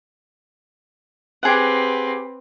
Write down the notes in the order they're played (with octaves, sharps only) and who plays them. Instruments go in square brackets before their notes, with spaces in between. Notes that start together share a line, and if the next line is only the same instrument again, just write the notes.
[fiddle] C4 B4 [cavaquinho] G4 G#4 F#5